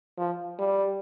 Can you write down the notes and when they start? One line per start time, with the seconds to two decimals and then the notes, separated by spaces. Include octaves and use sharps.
0.18 F3
0.59 G3